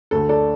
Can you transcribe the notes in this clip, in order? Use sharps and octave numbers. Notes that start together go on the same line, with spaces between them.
D2 D3 A3 A4
A4 D5